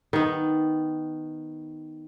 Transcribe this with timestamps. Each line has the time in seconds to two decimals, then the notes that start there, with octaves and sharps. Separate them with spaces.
0.13 D#3 B3